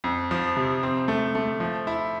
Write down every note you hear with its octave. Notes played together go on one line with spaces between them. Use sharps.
F2
F3
C3
C4
A3
A3
F3
E4